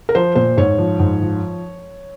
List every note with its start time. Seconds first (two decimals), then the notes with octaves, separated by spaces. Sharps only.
0.09 A#4
0.15 F3 C5
0.35 A#2 C5
0.57 G#2 C#5
0.79 F3
1.00 G#2
1.22 F3